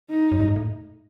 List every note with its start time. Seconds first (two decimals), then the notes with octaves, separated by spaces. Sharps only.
0.09 D#4
0.32 F#2
0.40 G2
0.48 G#2
0.56 A2